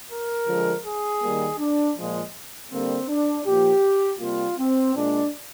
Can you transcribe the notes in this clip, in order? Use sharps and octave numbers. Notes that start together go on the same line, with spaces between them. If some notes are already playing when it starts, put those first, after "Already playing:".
A#4
D3 F3 G#3
G#4
D#3 G3 A#3
D4
A#2 F3 G#3
D3 G3 A#3 C4
D4
A#2 F3 A#3 G4
C3 G3 A#3 F4
C4
A#2 G#3 D4